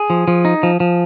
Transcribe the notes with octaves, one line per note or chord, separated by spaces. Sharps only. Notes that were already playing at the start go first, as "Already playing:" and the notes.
Already playing: G#4
F3
F3
D#4
F3
F3